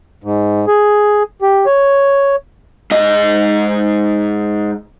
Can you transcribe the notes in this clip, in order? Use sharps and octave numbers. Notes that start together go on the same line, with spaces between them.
G#2
G#4
G4
C#5
G#2 D#5